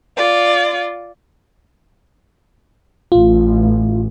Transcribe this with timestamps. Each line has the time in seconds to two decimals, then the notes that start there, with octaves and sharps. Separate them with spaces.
0.17 F4 D5
3.12 A1 F4